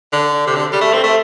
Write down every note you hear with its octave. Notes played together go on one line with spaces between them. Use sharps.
D3
C3
D3
G3
A3
C4
A3